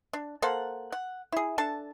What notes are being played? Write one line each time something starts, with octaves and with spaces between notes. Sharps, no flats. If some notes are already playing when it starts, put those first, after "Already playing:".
D4
A#3 A4 C5 F#5
F#5
E4 G#4
D4 A4 A5